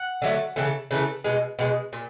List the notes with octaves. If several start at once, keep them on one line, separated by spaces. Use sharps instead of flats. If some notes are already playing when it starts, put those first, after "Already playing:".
Already playing: F#5
D3 F#3 A3
C#3 E3 A3
C#3 E3 A3
B2 G#3
B2 G#3
A#2